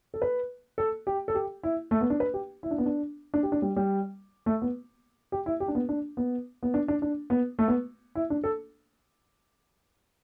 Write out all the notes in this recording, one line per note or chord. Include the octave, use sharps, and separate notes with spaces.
A4
B4
A4
G4
A4
G4
E4
A3
B3
D4
B4
G4
E4
D4
B3
D4
D4
G4
D4
G3
G3
A3
B3
G4
E4
G4
D4
B3
D4
B3
B3
D4
D4
D4
B3
A3
B3
E4
D4
A4